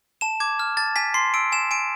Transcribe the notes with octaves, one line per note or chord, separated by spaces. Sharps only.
A5 E7
D6 G#6
F6
A5 A6
G#5 B6
C6 C7
E6 D7
G#5 E7
G#5 D7